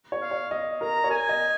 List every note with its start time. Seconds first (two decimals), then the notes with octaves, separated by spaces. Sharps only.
0.12 C#5
0.22 F5
0.31 C#5
0.51 D#5
0.81 A#4 A#5
1.04 C#5
1.09 A#4 G#5
1.29 D#5